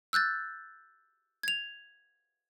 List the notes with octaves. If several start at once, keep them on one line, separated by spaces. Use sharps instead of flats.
E6 F#6 G6 A6
G#6 F7